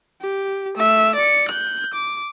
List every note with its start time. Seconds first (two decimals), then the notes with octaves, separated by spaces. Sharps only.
0.22 G4
0.76 A3 E5
1.16 D5 C#7
1.48 F#6 G6
1.94 D6